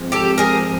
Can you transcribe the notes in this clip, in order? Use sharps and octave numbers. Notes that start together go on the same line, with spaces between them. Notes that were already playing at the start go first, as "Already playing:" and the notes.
Already playing: G#2 F3 G#3 C4
G4 A4
G#4 A#4